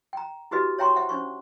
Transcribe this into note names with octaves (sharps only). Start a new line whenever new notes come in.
G5 A#5
E4 F#4 G4 B4 D#5
C#5 E5 G5 A#5 C6 C#6
C5 E5 F#5
C#4 D4 C5 C#6